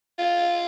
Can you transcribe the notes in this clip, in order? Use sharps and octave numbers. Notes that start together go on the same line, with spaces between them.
F4